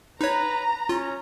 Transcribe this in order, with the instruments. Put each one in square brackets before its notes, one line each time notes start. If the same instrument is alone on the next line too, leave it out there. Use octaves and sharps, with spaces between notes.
[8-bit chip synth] D#4 C#5 [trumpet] B4 [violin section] A#5
[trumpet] C#4 [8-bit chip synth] F4